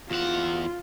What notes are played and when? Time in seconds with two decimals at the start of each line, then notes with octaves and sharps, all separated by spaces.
0.11 E2 F4 F#5